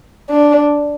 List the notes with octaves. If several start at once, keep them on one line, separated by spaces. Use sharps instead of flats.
D4